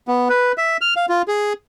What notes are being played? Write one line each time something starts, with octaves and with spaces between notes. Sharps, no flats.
B3
B4
E5
F6
F5
F4
G#4